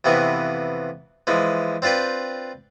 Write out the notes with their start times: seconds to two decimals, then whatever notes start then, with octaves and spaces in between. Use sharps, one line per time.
0.04 F2 C3 E3 B3 C#6
1.27 E3 F3 G#3
1.82 C4 D4 F4 B4 G5